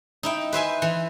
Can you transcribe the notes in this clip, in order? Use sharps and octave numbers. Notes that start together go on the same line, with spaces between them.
D#4 E4 G5
B4 C5 E5 G#5
E3